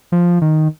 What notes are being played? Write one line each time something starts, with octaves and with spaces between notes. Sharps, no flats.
F3
D#3